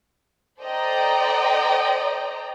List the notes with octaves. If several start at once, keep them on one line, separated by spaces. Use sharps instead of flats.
A4 C5 D5 D#5 G5 A#5